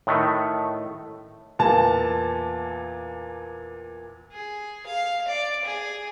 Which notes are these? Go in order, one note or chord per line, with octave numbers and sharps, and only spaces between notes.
A2 D#3 A3
E2 A#2 A5
G#4
F5
D5
G#4